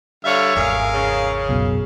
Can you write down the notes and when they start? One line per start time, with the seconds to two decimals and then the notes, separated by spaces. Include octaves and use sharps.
0.25 D3 G3 C#5 E5 F5
0.55 G#1 E2 G#4 A#4 F5
0.93 C#3
1.49 C#2 F#2 B2